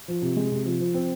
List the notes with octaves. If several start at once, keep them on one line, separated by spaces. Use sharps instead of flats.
F3
C3
G#3
C3
F3
F3
C4